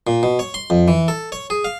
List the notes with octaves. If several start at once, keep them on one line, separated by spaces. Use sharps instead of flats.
A#2
B2
C#5
C6
F2
E3
A4
C#5
G#4
F5